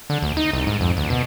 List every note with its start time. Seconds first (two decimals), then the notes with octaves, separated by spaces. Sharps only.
0.10 D3
0.22 D2
0.37 D#4
0.53 C2
0.67 G#2
0.81 F2
0.97 D2
1.10 B2